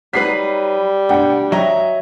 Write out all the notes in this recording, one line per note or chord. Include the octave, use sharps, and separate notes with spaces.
F#3 G3 D#4 B4 B6 C7
D2 B2 D4 F#5 G5
F#3 D#5 E5 A#5